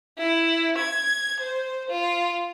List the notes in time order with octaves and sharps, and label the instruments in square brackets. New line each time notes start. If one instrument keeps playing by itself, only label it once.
[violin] E4
G#6
C5
F4